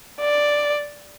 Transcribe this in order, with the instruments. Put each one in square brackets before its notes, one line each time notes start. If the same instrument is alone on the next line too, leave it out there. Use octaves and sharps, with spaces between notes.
[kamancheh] D5